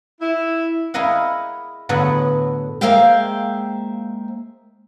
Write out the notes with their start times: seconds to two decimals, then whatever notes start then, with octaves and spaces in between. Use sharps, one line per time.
0.21 E4
0.94 E4 G#4 A#4 D#5 F5 F#5
1.89 A2 D3 F#3 B3 G#4 F#5
2.81 G#3 A#3 C5 E5 F5 G5